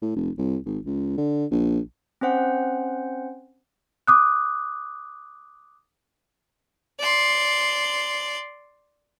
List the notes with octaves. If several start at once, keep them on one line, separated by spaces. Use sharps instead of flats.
A2
F1
C2
G#1
C#2
D3
A#1
C4 C#4 C5 F#5
D6 D#6 F#6
D5 C6